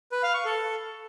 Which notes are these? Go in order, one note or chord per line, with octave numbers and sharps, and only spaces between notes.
B4
F5
C#6
A4